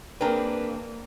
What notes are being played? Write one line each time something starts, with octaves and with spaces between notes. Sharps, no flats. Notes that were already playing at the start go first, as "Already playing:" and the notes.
A#3 C4 D4 G#4 A#4 B4 G5